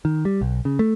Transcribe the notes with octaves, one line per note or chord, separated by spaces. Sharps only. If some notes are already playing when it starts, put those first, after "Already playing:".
D#3
G3
B1
C#3
A3